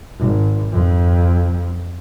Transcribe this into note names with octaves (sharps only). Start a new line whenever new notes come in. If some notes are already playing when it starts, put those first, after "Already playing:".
G#1
F2